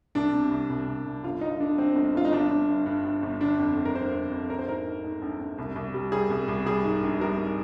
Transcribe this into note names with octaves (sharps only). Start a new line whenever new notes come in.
C2 D4
C3
C2
C2
C2
C2
G1 F4
G2 D#4
D3 D4
D3 C4
G1
G1 F4
D#4
G1 D4
G1
G2
G2
G2
G1
D3 D4
F2
F2
A#4
D3 C5
F2
F2
A#1 A#4
C5
G#2 A#4
G#2
G#2
A#1
A#1
C2
C2
G3
G3 G#4
C2
C2
G3 G#4
G#2
A#1
G3 A#4
G#2